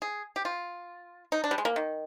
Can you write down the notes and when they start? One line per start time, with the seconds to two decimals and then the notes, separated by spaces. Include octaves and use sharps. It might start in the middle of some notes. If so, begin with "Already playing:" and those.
0.02 G#4
0.36 G4
0.45 F4
1.32 D#4
1.44 D4
1.51 G3
1.58 G#3
1.65 A#3
1.76 D#3